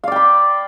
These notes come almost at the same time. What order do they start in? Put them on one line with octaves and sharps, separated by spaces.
F5 D5 G5 B5